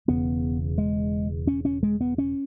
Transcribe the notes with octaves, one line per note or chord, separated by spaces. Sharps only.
E1 E2 C#3 B3
G#3
C#4
C#4
G#3
B3
C#4